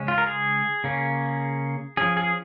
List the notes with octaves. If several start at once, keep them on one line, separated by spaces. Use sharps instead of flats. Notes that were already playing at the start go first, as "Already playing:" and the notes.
Already playing: C#3 G#3 C#4
F4
A#4
G#4
C#3 A#3 C#4
F3 C#4 G#4
G#4